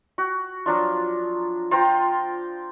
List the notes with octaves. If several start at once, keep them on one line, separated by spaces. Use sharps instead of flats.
F#4
F3 F#3 D4 F4
F4 C5 G5 A#5